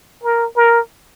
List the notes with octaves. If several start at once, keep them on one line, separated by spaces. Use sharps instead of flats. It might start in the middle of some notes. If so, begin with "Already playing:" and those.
A#4
A#4